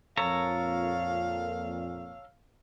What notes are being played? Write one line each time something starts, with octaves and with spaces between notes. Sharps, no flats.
F2 A#2 A4 C#5 F5 A#5